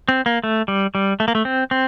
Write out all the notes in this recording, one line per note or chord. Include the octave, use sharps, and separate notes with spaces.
C4
A#3
A3
G3
G3
A3
A#3
A3
C4
C4